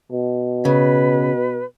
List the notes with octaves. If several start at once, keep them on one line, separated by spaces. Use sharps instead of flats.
B2
C#3 B4